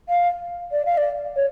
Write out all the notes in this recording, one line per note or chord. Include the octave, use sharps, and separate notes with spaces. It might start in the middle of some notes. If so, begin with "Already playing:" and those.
F5
D5
F5
D5
C#5